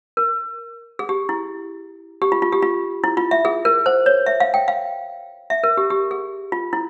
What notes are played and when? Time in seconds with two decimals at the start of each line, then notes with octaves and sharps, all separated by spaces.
0.17 A#4
0.99 G#4
1.09 G4
1.29 E4
2.22 G4
2.32 F4
2.42 F4
2.52 G4
2.62 F4
3.04 E4
3.17 F4
3.31 E5
3.45 G#4
3.65 A#4
3.86 C5
4.06 C#5
4.26 E5
4.40 F5
4.54 G5
4.68 F5
5.50 E5
5.64 A#4
5.77 G4
5.90 G4
6.11 G#4
6.52 F4
6.73 E4